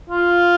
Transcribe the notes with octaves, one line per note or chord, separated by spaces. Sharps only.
F4